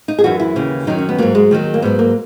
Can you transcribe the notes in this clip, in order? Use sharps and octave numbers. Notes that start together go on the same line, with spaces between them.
D#4
G#4
F#2 E3 F#4
E4
D#2 C#3 E3
F#2 D#3 F#3 D#4
C#4
B3
G#2 F#3 A#3
G#3
D#2 D#3 F#3
A#3
G#2 F#3 B3
A#3